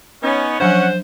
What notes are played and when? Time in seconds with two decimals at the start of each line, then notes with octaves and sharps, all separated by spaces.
0.23 B3 C#4 D#4
0.60 F3 F#3 C#4 D4 C5 F#5